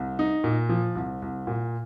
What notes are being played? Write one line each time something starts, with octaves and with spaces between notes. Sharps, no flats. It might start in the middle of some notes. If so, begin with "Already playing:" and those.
Already playing: C2
D#4
A#2
F3
C2
C2
A#2